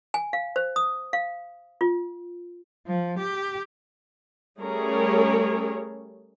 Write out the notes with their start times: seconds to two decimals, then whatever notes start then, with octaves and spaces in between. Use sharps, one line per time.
0.14 G#5
0.33 F5
0.56 C5
0.76 D#6
1.13 F5
1.81 F4
2.87 F3
3.19 G4
4.59 G3 A3 C#4 G#4 A#4 C#5